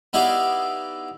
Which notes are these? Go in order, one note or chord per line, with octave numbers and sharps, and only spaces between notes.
B3 D#4 E4 G4 D5 F5